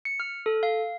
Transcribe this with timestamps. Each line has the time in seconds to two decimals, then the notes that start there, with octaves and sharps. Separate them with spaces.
0.05 C#7
0.20 F6
0.46 A4
0.63 F5